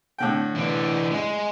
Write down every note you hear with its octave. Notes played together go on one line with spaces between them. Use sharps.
A2 D3 G5
E3 D4
G#3